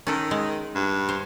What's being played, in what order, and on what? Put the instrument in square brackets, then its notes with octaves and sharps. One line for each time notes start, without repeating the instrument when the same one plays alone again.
[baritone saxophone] D#3 [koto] C#4 A4
[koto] G#3
[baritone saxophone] G2
[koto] C5